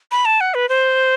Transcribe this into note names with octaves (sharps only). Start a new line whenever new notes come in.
B5
A5
F#5
B4
C5